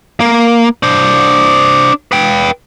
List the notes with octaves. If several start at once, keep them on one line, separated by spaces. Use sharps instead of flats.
A#3
D4 C5
B4 G5